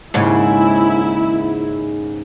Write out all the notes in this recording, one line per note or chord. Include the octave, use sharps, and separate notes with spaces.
D#2 G#2 C#3 E4